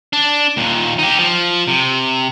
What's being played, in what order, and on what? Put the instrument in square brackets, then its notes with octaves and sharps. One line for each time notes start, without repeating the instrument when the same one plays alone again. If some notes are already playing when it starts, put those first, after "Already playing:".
[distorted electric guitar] D4
D#2 A#2
D#4 G4
F3
C3